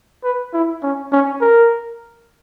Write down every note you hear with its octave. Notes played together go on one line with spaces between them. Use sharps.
B4
E4
C#4
C#4
A#4